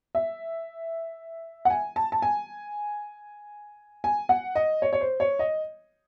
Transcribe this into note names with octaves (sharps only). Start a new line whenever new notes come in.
E5
F#5
G#5
A5
A5
G#5
G#5
F#5
D#5
C#5
C#5
C5
C#5
D#5